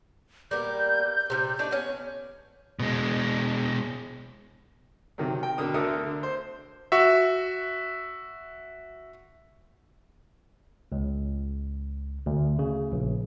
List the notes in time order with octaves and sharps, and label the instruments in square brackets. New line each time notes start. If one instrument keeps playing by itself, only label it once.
[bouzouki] G3 A#3 B3 [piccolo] G6
[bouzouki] C3 E3 G3
A3 D4 D#4
B3 C#4
[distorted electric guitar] B2 G#3
[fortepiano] C3 D#3 F#3
G5
B2 D3 A#4 D#6
D2 D3 A4 A#4 E5 D#6
D3
C5
[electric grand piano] F#4 E5
[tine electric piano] C#2
D2
C#3
A#1